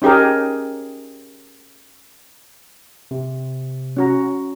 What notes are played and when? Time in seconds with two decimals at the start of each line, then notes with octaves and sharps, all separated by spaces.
0.02 C#4 D#4 G4 G#4 A#4
3.11 C3
3.97 C#4 F#4 A#5